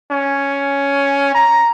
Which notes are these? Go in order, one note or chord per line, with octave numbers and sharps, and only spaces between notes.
C#4
A#5